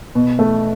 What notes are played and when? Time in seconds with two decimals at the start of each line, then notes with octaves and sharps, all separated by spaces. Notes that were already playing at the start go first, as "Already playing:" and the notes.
0.15 B2
0.39 A3